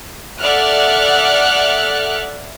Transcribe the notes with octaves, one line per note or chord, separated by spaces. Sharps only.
A4 D5 E5 F#5 F6 F#6